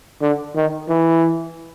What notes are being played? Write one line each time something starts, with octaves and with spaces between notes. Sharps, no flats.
D3
D#3
E3